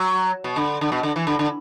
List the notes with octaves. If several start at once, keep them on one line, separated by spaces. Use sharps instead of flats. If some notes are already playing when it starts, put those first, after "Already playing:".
Already playing: F#3
B2
D3
D3
B2
D3
E3
D3
D3